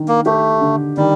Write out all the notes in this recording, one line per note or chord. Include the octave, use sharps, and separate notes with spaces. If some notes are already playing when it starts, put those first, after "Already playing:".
Already playing: D#3 D4
A#3
A3 G4
D3
D#3 G3